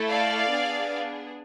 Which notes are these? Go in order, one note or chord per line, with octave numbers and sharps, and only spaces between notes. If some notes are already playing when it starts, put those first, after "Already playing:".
Already playing: A3 E4 A4
D5 F5
B3 D4 G#4